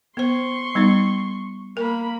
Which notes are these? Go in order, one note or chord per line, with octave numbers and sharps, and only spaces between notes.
B3 C5 C6 C#6
G3 B3 D#4
A#3 A#4 B5